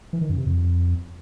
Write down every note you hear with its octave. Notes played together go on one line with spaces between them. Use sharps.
E3
D#3
F#2
C3
F2